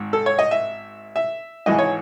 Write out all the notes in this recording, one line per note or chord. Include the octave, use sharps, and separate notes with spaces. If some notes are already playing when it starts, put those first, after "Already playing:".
Already playing: G#1 G#2
A4
C#5
D#5
E5
E5
G#1 G#2 E3 G#3 D#5
C#5